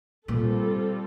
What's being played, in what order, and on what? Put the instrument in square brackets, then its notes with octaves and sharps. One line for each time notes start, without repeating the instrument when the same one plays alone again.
[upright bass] A#2 [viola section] G3 C4 F4 A4